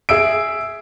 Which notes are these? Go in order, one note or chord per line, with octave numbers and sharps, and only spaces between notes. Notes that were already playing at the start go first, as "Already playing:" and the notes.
G#4 E5 E6 D7